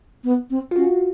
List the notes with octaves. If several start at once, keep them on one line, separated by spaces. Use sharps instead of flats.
B3
C4
F4
C#4 F#4